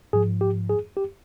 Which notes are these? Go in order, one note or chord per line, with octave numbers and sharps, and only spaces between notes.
G#2 F3 G#4
G4
G#4
G4